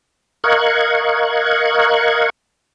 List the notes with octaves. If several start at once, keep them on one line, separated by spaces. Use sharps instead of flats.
A#4 D#5 F5 C#6 F#6 G#6